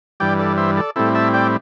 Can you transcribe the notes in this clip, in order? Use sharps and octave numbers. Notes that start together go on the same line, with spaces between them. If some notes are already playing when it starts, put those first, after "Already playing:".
G2 E3 G3 D5 G5
A4 D5
C5 E5
A4 D5
A2 G3 C4 E4 A4
E5 A5
D5 G5